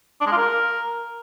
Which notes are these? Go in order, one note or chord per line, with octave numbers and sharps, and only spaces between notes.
D4
G#3
F4
A#4